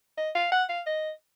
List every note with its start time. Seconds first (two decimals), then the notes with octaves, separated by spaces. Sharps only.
0.18 D#5
0.35 F5
0.52 F#5
0.69 F5
0.86 D#5